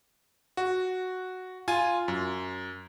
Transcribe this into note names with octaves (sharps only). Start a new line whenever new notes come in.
F#4
F4 G#5
F#2